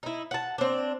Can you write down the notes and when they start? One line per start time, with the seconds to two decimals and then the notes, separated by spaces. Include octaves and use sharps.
0.03 D#4 E4
0.31 F#5 A5
0.58 C4 D4